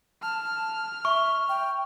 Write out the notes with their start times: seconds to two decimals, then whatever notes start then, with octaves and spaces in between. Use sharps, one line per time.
0.22 A5 F6
1.05 E5 C#6
1.49 G5